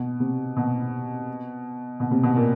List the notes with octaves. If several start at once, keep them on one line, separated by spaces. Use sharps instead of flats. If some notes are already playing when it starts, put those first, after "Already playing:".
Already playing: B2
C3
B2
B2
C3
B2
A#2